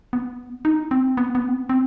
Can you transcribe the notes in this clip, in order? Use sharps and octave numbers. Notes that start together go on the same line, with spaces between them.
B3
D#4
C4
B3
B3
C4
B3
C4